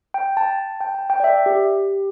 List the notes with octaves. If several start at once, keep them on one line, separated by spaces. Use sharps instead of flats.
G5
A5
G5
A5
G5
D5
E5
G4